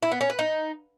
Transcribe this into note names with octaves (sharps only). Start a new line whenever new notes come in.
E4
B3
C#4
B4
D#4